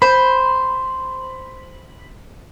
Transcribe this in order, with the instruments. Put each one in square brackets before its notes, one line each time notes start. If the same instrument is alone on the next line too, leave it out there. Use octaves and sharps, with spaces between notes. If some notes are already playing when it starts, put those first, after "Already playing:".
[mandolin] C5 [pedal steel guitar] B5